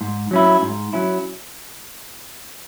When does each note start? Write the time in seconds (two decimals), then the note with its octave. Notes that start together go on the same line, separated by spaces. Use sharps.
0.01 G#2
0.31 F#3 C#4 E4
0.62 G#2
0.93 F#3 C#4 E4